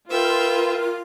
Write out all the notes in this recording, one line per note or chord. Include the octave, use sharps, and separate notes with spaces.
F4 A#4 B4 E5 G5